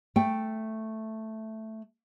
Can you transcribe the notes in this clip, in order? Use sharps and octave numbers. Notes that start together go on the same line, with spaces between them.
A3 G5